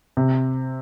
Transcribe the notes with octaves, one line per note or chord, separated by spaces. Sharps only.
C3